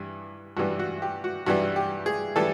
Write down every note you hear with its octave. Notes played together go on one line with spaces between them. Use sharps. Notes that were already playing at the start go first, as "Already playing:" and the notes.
Already playing: G2 E3 G3
G2 E3 G3 F#4
F#4
G4
F#4
G2 E3 G3 F#4
G4
G#4
E3 G3 A4